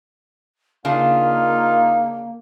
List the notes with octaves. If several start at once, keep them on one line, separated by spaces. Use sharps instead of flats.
C#3 A#3 D4 D#4 F4 F5